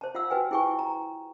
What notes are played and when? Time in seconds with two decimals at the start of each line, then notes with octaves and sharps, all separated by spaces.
0.01 C5 A5
0.15 F4 F5 F#5 E6
0.30 F#4 B4 G5 G#5
0.51 E4 G#4 G5 G#5 C#6
0.79 A#5